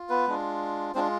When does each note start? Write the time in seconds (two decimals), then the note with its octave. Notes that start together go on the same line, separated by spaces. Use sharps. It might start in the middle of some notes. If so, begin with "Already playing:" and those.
Already playing: F4
0.10 B3 B4
0.27 G#3 D4 F4
0.95 G#3 C4 D4 F4 C5